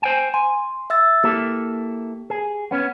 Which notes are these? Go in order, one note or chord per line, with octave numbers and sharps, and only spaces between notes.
C5 G5 G#5
G#5 C6
E5 E6 A6
A#3 E4 G4 A4
G#4
B3 C#4